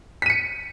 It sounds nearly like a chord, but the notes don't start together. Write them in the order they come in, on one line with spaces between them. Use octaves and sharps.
B6 D#7 C#7